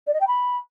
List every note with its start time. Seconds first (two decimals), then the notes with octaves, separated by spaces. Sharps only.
0.07 D5
0.14 D#5
0.21 G5
0.27 B5